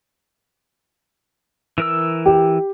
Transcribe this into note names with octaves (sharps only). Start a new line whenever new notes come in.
E3 A#4 E6
G4